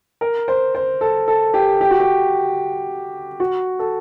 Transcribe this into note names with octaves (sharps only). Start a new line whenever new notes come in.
A#4
C5
C5
A4
A4
G4
G4
F#4
G4
F#4
A4